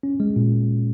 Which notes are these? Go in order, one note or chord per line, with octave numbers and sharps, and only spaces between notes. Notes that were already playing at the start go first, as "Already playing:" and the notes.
C#4
G#3
A#2